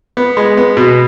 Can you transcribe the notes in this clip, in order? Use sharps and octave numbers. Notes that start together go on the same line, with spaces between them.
B3
G#3
B3
B2